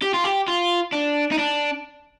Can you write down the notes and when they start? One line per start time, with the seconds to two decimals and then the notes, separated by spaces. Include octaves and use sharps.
0.02 G4
0.14 F4
0.24 G4
0.48 F4
0.92 D4
1.31 D#4
1.38 D4